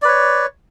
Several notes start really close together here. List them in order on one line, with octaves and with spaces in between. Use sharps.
D5 B4 C#5